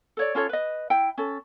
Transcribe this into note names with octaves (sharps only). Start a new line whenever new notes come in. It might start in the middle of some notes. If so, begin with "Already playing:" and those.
A4 C#5 D5
C#4 F4 A4 C#5
B4 D#5
E4 G5
C#4 A4